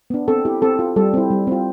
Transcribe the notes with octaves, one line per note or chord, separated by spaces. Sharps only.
B3 D4
C4 A4
E4 G4
C4 A4
F4
G3 A4
C4 E4
G3
C4 F4